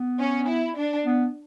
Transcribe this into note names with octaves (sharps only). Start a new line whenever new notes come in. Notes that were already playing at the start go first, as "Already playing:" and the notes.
Already playing: B3
C#4
E4
D4
B3